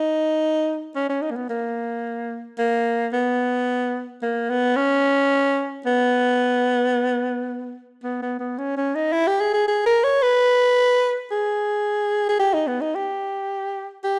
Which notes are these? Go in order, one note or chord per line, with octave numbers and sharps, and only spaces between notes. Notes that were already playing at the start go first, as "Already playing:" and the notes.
Already playing: D#4
C#4
C#4
D#4
A#3
B3
A#3
A#3
B3
A#3
B3
C#4
B3
B3
B3
B3
C#4
C#4
D#4
E4
G4
G#4
G#4
G#4
A#4
C#5
B4
G#4
G#4
G4
D#4
B3
D#4
G4
G4